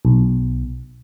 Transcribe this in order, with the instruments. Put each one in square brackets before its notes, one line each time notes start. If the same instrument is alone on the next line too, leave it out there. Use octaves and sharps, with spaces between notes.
[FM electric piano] B1